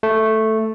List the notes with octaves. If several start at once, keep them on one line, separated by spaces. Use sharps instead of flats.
A3